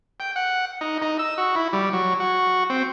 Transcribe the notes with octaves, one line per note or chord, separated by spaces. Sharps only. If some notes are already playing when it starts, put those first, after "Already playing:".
G5
F#5
D#4
D#4
E6
F#4
E4
G3
F#3
F#4
C4